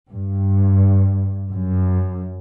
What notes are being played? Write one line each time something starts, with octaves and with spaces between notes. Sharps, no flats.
G2
F#2